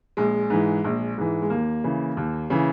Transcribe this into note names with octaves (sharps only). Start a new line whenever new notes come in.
A#1 G#3
G#2 E3
A#1
G#2 E3
G#3
D#2 A#3
C#3 E3
D#2
C#3 E3